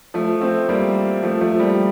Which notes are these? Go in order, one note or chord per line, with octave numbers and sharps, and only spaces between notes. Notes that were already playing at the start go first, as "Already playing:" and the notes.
F3 A3
A3 C4
G3 A#3
F3 A3
F3 A3
G3 A#3